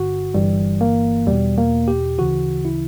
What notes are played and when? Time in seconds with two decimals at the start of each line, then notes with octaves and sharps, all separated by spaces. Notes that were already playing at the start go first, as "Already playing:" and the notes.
Already playing: G1 G2 D3 F#4
0.34 G1 G2 E3 G3
0.81 A#3
1.26 E2 B2 G3
1.58 A#3
1.88 G4
2.19 D2 C#3 E3 F#4
2.65 E4